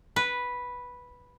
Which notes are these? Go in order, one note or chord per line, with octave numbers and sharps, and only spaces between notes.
B4